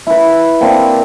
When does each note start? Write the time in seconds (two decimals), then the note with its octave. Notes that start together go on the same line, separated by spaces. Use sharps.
0.07 E4 B4
0.61 A#3 C4 D4